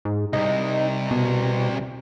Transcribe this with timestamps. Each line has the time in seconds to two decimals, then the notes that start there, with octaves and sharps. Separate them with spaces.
0.05 G#2
0.33 C2 C3 D#4
1.11 B2